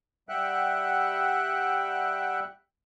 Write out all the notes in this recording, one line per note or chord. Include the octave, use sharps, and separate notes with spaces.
G3 E5 F#5 G5 F#6